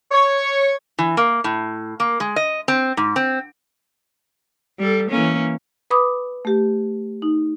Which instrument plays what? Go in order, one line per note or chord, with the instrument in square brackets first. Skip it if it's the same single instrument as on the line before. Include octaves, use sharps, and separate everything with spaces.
[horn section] C#5
[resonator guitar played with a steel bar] E3
A#3
A2
A#3
G#3
D#5
C4
G#2
C4
[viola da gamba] G3 A4
E3 A#3 C#4
[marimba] B4 B5 D6 D#6
A3 G4
D#4